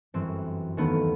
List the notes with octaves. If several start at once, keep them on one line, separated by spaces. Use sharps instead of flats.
G1 F#2 E3 G3 C4
E1 D#2 D#3 A3 B3